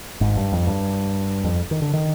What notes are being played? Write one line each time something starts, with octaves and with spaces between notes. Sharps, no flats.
G#1 G#2
G2
F2
G2
F2
D#3
D3
D#3